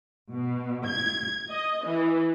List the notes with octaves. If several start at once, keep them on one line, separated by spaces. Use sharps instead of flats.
B2
G#6
D#5
E3